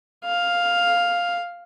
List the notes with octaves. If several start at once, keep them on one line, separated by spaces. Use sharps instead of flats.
F5